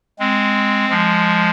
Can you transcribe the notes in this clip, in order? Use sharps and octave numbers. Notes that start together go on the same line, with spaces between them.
G#3 C4
F3 G#3